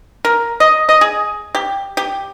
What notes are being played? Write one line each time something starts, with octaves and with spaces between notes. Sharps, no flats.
A#4
D#5
D#5
G#4
G4
G4